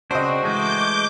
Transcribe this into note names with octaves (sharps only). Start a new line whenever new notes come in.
C#3 C4 D4 F#4 C5 D#5
E3 G#3 A3 D6 G6